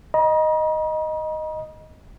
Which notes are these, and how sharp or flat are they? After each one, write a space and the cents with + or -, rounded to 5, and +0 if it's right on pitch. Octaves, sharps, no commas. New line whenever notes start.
D#5 +0 A#5 +45